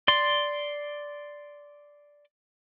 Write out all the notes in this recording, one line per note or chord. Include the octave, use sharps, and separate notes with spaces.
D5 C6